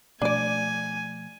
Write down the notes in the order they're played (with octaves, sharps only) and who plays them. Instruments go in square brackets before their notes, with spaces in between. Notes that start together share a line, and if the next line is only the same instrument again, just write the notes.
[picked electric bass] B2 F3 A3 [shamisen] D4 D5 [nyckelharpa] G#5